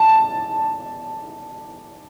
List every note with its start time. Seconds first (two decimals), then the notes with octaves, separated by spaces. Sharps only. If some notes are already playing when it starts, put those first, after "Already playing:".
Already playing: A5